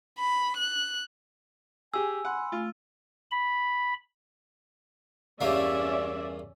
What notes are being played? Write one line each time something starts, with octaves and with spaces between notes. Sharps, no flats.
B5
F#6
G4 G#4 G#5 E6
F#5 B5 C6
A3 F4
B5
E2 G2 A#3 C#4 D5 E5